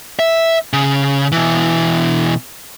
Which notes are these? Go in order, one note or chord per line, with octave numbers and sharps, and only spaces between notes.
E5
C#3
B2 E3